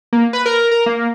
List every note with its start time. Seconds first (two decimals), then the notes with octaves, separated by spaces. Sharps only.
0.13 A#3
0.33 B4
0.46 A#4
0.71 A#4
0.86 A#3